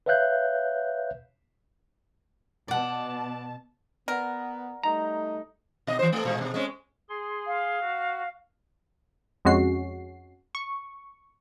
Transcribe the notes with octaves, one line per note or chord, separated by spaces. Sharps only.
B4 C#5 E5 F5 F#6 G6
B2 D5 F#5 A5
B3 A#4 D5 F#5
G3 A3 D#4 A#5
B2 D#5
E3 C5
A3 A4
A#2 G#3 G#4
B2
G#3 C4 C#4
G#4 C6
F5
F#4
F2 G#3 C#4 F#4 C7
C#6